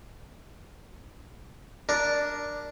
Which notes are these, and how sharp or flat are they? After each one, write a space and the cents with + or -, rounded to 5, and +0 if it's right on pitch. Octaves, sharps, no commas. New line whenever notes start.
D4 +0 A#4 +0